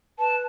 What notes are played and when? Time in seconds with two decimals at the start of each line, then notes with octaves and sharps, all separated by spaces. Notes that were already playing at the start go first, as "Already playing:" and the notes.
0.19 B4 A5